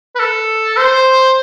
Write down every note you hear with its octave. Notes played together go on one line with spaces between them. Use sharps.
B4
A4
C5